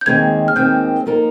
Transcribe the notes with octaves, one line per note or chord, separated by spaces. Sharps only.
G6
D#2 D#3 G#3 C4 G#6
F6
D#2 D#3 G#3 C4 G6
F3 A#3 D#4 A#4